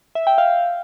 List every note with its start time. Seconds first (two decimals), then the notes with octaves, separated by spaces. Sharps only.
0.15 E5
0.27 G5
0.38 F5